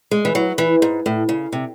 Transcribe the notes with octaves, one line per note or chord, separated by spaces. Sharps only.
G#3
E3
F#3
E3
G#2
A2
C#3
C3